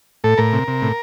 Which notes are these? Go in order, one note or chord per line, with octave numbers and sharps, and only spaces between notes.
A2 A4
A2 A#4
C3
C3
A2